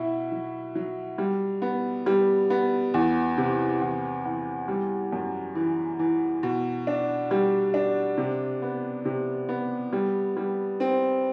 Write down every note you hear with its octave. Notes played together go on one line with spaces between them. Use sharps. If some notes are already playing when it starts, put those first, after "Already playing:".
Already playing: B2 E4
F#3
F#3
G3
B3
G3
B3
E2
C3
E2
E2
G3
F#2
E3
E3
B2
D4
G3
D4
C3
B3
C3
B3
G3
G3
C4